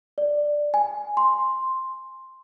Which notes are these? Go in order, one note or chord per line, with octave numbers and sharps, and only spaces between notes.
D5
G#5
C6